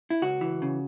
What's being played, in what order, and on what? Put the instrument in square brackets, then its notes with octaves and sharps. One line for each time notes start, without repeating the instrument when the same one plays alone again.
[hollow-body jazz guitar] E4
C#2 F#4
E3
C#3